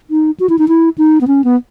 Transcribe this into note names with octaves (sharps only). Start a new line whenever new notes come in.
D#4
F#4
E4
D#4
E4
D#4
B3
C#4
B3